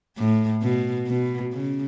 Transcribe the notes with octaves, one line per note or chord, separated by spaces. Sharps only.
A2
B2
B2
C#3